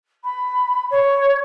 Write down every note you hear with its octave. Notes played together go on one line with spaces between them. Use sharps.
B5
C#5